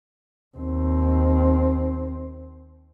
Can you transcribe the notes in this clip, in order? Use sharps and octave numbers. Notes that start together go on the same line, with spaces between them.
D#2 C4